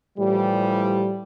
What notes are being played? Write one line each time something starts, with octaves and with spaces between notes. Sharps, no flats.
A2 E3 F3 G3